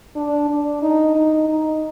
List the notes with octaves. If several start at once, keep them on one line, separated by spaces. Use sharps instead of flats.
D4
D4
D#4
D#4
D#4